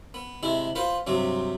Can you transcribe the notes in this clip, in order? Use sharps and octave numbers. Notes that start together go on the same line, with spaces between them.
B3
C3 G#3 E4 G#4
F4 B4 C5 F#5
G2 C3 F#3 C4